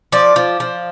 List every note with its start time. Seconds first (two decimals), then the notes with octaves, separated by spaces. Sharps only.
0.12 F3 D5
0.36 F3
0.60 F3